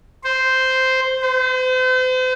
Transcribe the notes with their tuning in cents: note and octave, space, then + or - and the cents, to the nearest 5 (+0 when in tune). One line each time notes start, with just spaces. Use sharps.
C5 -5
C5 -40